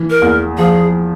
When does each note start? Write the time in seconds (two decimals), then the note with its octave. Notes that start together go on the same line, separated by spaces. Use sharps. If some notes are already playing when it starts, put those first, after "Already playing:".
Already playing: E3
0.10 A#4
0.22 E2
0.58 F3 G#4